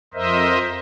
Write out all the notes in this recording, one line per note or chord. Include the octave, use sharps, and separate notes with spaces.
F2 A#4 C5 D#5 E5